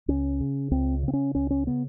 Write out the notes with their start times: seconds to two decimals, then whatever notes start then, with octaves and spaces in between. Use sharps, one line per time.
0.08 C#2 C#4
0.40 C#3
0.71 C#2 C4
1.03 C#3 C4
1.13 C#4
1.35 C#2 C#4
1.51 C#4
1.67 C#3 B3